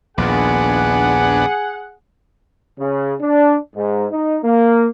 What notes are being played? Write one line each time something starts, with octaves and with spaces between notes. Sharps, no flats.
A#1 D#2 A#2 B3 D4 G#4 F#5
C#3
D4
G#2
D#4
A#3